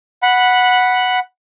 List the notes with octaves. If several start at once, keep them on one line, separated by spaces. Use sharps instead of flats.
F#5 B5